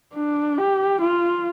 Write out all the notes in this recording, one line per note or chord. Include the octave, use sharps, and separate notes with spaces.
D4
G4
F4